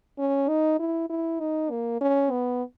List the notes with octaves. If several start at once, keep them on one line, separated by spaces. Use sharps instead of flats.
C#4
D#4
E4
E4
D#4
A#3
C#4
B3